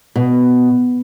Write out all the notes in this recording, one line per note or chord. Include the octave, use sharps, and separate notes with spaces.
B2